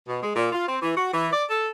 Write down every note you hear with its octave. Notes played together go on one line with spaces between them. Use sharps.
B2
G#3
A#2
F4
C4
E3
F#4
E3
D5
A4